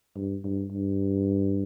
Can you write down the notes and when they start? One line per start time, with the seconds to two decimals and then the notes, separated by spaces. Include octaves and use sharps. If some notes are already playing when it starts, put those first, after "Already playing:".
0.15 G2
0.44 G2
0.72 G2